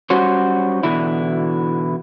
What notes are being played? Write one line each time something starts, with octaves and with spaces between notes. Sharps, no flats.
F#3 G3 C#4 F#4 C5
B2 D3 E3 E4